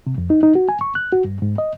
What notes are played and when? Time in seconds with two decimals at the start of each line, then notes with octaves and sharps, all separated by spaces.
0.07 C3
0.18 F2
0.30 D#4
0.43 D#4
0.55 F#4
0.69 G#5
0.81 C#6
0.95 F#6
1.12 F#4
1.25 G2
1.42 G#2
1.58 D#5